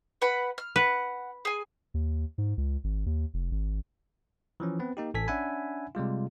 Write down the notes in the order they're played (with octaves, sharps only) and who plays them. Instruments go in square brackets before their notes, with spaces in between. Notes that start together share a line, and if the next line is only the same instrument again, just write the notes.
[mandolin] B4 F#5 B5
F6
[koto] B4 [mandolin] F#5
[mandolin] G#4 G#5
[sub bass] D#2
G#2
C#2
G#1
D#2
F1
G#1
[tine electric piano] E3 F3 C#4
B3 C4 B4
A#3 D#4 G4
A1 A4 G#5 B6
C#4 D4 E5 F#5 G#5 B5
C3 G3 G#3 F4